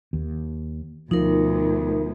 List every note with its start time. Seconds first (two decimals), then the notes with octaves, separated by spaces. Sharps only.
0.13 D#2
1.11 D2 B2 F3 D#4 A#4